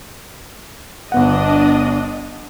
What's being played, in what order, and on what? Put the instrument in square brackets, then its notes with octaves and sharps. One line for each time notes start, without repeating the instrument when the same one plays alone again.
[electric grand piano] G1 B3 F#5 [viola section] D4 D#5